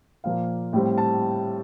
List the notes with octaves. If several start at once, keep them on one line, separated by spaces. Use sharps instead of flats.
A#2 F3 A#3 F5
A2 G3 C4
A5